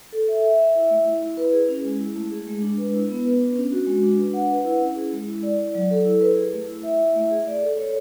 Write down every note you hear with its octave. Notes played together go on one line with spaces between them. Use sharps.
A4
E5
E5
E5
E4
A3
E4
E4
B4
G#4
C#4
G#3
E4
A3
G#4
G#3
D4
B4
E4
B3
B4
D4
C#4
F#4
G#3
D4
B4
F#5
B4
E4
C#4
G#4
G#3
E4
D5
D5
F#3
A4
E4
B4
G#4
A3
E4
E5
E4
A3
G#4
D5
A4
C#5